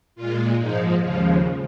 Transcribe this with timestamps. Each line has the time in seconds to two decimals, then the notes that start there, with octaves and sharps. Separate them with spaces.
0.16 A#2 G#3 F4
0.59 G#2 F3 G#3 D#4
1.02 D#2 C#3 F3 G#3 F4